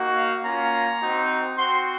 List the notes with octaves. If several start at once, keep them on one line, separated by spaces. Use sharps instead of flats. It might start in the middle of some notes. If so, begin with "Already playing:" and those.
Already playing: A#3 D#4 F#4
F5
A#3 C#4 F4 A#5
C4 D#4 F#4
C4 F#4 C6